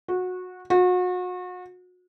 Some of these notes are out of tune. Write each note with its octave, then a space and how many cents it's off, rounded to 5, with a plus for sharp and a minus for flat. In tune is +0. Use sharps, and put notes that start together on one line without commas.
F#4 -20
F#4 -35